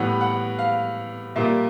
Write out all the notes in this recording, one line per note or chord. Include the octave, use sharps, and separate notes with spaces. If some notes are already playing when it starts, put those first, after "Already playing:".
Already playing: A2 E3 G3 B3 F#5
F#5
F5
A#2 G3 A#3 E5